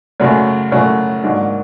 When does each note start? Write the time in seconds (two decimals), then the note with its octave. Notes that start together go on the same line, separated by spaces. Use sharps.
0.20 F#2 C#3 F#3 A3
0.72 F#2 C#3 F#3 A3
1.23 G#2 D#3 F#3 A#3 D4